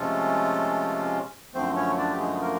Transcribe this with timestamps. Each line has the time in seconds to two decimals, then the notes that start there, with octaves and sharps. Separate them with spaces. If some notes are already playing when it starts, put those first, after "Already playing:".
Already playing: C3 F3 G#3 A3 C#4 F4 A4
1.54 F#2 D3 F3 A3 C4 C5
1.75 C#4 C#5
1.98 D4 D5
2.10 G4
2.19 G#3 G#4
2.41 A#3 A#4